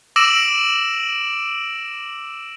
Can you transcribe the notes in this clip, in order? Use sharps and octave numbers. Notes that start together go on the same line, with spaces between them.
D6 E6 A#6 D7 E7 F#7